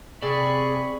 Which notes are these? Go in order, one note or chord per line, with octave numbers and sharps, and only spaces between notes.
C3 G#4 D5 B5 C#6